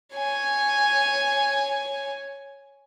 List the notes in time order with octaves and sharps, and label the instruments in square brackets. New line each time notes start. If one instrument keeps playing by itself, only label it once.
[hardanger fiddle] C#5 G#5